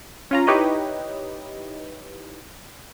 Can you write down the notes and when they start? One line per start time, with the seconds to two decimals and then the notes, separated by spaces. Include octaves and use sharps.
0.31 C#4 F4 A#5
0.47 D#4 E4 G4 B4 C#5 D#5